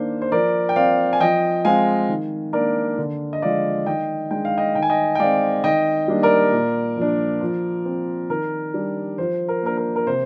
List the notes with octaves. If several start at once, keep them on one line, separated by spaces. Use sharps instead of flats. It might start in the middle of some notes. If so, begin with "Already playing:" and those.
Already playing: D#3 A#3 D4 C5
C5
F3 A#4 D5
G5
C4 D5 F5
G#5
F3 D#5 G5
G#3 C4 F5 G#5
D#3
A#3 D4 A#4 D5
D3
D#5
F3 G#3 D5 F5
D#3 D#5 G5
G#3 D4 G5
F5
D#5 G5
D#3 G5
G#5
D#5 G5
G5
G#3 C4 D5 F5
D#3 D#5 G5
G3 A#3 D4
A#4 D5
A#2
F3 A#3 D4
F3
C4
D#3 A#4
G3 D4
F3 C5
A#4
A#3 D4 A#4
A#4
A#4
C3 C5